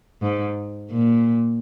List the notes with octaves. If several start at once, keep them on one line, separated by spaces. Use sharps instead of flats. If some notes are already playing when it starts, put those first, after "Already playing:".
G#2
A#2